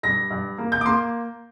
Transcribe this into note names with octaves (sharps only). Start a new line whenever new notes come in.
G2 A#6
G2
A#3
G6
D6
A#3 C6